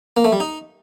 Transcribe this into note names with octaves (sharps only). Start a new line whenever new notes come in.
A#3
A3
G3
D#4